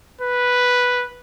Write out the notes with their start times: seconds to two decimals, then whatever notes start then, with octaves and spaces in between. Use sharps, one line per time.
0.21 B4